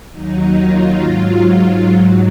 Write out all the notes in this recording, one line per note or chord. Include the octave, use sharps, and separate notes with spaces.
D#2 D#3 F#3 D#4
F4
G#2 F#3
G#2 F#3